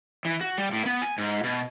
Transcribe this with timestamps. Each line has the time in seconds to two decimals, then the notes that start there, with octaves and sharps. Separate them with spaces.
0.25 E3
0.41 F#4
0.58 G3
0.73 A2
0.86 B3
1.02 G#5
1.18 G#2
1.44 B2